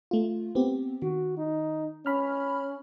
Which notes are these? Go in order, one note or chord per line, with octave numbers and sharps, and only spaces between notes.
A3 F4
B3 C4 G4
D#3 F#4
D#4
C#4 B5 F6